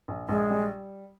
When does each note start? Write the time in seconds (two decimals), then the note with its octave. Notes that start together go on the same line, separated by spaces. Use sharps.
0.08 A#1
0.29 A#1 G#3
0.50 G3